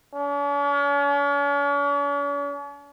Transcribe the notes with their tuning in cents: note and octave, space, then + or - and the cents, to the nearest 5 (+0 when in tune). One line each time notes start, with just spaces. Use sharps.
C#4 +45